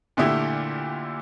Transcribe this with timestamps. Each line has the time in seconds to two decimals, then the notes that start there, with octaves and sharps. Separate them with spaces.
0.17 A#2 D3 A3 E4 G4